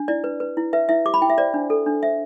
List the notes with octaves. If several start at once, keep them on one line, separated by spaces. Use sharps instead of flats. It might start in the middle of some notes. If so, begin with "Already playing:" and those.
Already playing: D4
E4 D5
B4
B4
E4
B4 E5
E4 E5
G4 D6
B5
E4 G5
E5
C5 D5
D4
A4
D4
C5 E5